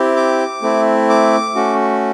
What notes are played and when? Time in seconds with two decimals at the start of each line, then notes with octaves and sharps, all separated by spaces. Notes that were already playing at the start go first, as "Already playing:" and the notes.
Already playing: C4 E4 G4
0.16 D6
0.62 A3 C4 E4
1.09 D6
1.55 A3 C#4 F#4